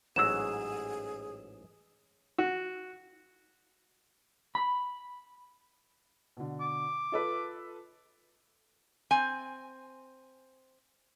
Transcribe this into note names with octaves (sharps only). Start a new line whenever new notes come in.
A1 G#2 F#3 G#4 E6 E7
F#4
B5
B2 D3
D6
F4 A4 B4
C4 G#5